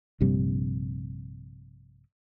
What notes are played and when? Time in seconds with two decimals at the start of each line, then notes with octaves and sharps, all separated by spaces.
0.21 A#1 G2 C3 G3